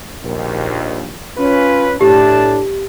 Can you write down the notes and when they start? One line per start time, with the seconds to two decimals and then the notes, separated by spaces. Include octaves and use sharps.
0.23 A#1 D#2
1.37 C#4 F4 B4
2.01 A2 D4 G4 A5